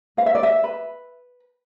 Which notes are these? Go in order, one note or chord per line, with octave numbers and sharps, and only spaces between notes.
B4 F5
E5
D5
E5
B4